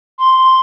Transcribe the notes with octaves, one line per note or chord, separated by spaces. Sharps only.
C6